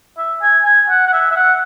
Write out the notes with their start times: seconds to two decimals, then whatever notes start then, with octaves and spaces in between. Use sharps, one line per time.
0.18 E5
0.42 G#5
0.65 G#5
0.89 F#5
1.07 F#5
1.13 E5
1.31 E5
1.36 F#5